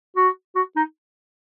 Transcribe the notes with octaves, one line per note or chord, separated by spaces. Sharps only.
F#4
F#4
D#4